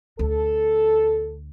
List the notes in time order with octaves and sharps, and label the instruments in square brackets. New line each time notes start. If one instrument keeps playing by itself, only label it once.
[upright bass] D2 [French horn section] A4